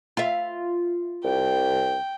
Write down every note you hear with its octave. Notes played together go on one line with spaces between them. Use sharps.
F4 E5
C2 G5